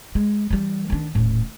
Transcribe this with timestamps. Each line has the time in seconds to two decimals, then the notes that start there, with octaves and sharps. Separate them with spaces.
0.15 G#3
0.50 E3 G3
0.90 D#3 D4
1.15 D#1 A2